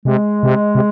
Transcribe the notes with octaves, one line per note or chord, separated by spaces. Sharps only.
C3 G#3
C3
C3